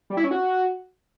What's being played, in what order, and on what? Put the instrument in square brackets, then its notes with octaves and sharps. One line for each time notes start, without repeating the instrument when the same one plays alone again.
[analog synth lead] G3
E4
C#4
F#4